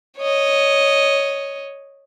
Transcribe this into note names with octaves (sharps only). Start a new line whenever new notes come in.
C#5 D#5